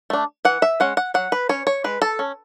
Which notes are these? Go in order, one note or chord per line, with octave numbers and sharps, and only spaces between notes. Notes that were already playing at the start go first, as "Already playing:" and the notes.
A3 D4
E3 F#5
E5
G#3 C#4 F#5
F#5
F#3 F#5
B4
C#4 C#5
C#5
G#3 B4
A4
C#4